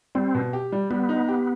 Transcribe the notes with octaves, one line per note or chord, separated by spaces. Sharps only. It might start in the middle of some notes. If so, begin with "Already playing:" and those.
G3 C4
B2
G4
G3
G3 B3
D#4
G4